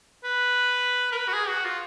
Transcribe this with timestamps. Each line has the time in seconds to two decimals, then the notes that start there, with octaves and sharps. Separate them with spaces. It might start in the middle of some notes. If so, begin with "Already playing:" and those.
0.23 B4
1.12 A#4
1.17 B4
1.28 F#4
1.33 G#4
1.48 F#4
1.65 F4